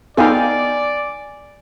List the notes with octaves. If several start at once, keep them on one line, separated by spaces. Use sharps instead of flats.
B3 D#4 A4 D5 F5 G5 G#5